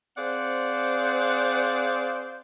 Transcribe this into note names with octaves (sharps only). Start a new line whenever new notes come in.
C4 G#4 C5 D5 F5 F#5